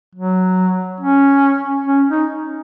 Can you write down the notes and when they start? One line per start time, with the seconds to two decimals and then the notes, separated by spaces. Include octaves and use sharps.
0.15 F#3
1.01 C#4
1.87 C#4
2.09 D#4